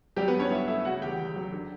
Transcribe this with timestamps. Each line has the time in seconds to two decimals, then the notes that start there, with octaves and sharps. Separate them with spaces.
0.16 F#3 G3 G4
0.28 B3 B4
0.34 G2
0.39 C#4 C#5
0.51 G2 E4 E5
0.68 A3 E4 E5
0.85 C#3 F#4 F#5
1.01 E2 G4 G5
1.18 E2
1.36 F#3
1.52 D3